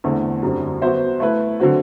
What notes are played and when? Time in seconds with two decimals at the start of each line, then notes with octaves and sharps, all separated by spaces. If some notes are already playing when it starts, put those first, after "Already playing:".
0.04 E2 D3 A3 C4
0.43 F#2 D3 G3 C4
0.82 F#3 B3 F#4 C5 E5
1.20 A3 E4 B4
1.60 D3 F#3 C4 F#4